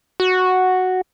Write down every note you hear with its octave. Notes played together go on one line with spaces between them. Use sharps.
F#4